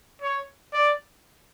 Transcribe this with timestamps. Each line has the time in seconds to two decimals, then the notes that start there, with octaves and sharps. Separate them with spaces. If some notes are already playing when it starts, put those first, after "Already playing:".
0.22 C#5
0.73 D5